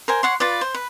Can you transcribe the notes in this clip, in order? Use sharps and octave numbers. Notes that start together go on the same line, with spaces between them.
A#4 C5 G#5
C#5 F#5 C6
F4 B4 D5
C5
B4